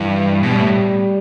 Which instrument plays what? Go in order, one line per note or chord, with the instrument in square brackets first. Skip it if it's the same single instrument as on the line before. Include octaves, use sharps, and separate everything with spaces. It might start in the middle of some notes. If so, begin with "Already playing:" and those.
Already playing: [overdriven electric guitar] G2 [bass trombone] E3
[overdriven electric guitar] B2 [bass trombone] G3
[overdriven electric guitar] A2